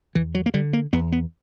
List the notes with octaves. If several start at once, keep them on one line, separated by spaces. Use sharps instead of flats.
E2 E3
F#3
A#3
D3 G3
A#3
E2 B3
B3